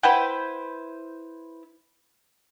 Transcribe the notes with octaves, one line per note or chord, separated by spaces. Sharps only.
E4 B4 C5 F#5 G5